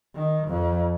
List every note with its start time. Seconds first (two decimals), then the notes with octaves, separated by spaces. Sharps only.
0.14 D#3
0.48 F2